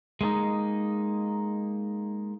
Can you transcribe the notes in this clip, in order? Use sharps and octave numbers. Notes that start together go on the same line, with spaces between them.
G#3 A#3 C#4 D#4